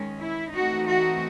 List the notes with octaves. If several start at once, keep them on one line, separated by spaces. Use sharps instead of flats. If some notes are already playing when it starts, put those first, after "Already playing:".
Already playing: D#3 G#3 C#4
E4
E3 A3 C4 D#4 F#4
F#4